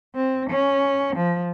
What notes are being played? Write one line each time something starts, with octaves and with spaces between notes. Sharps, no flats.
C4
C#4
F3